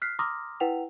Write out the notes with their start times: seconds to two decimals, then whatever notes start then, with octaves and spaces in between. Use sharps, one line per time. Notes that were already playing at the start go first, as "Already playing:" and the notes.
0.02 F6 F#6 B6 C7
0.19 A#5 C6 D6 D#6 F6 A#6
0.60 E4 B4 F#5 G5 F7